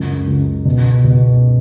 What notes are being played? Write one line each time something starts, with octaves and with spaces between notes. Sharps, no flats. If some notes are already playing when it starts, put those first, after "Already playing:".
Already playing: C#2 F#2
C#2
B2
B2